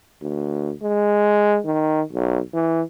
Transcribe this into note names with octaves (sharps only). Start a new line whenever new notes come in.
D2
G#3
D#3
B1
E3